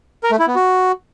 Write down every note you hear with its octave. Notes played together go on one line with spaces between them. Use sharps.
A#4
A3
E4
B3
F#4